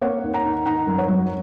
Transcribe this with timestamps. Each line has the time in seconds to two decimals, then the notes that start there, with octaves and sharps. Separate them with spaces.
0.01 A#3 C#5 F#5
0.23 D#2
0.34 F#5 A#5
0.45 D#3
0.66 D#4 F#5 A#5
0.87 F#2
0.98 C#5 F#5
1.08 F#3